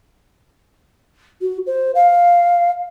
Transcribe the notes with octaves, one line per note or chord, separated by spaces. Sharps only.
F#4
C5
F5